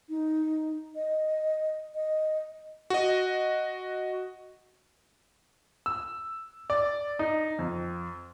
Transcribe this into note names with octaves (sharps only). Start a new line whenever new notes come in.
D#4
D#5
D#5
F#4 D#5
E6
D5
D#4
F2